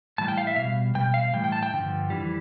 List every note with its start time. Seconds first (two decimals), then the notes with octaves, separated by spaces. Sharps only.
0.18 A2 E3 G3 A5
0.28 G5
0.38 F5
0.47 E5
0.56 B2 G3 F5
0.95 B2 G3 G5
1.14 F5
1.33 A2 E3 G3 G5
1.44 G5
1.52 A5
1.63 G5
1.72 G2 D3 F3
2.10 F2 E3 G3